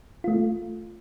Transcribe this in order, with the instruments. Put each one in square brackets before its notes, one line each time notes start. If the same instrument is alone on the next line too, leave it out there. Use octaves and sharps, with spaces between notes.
[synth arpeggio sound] A3 F4